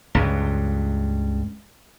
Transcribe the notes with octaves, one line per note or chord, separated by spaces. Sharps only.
C#2 G2